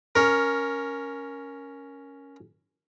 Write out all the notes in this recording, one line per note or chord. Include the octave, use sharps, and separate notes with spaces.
C#4 A#4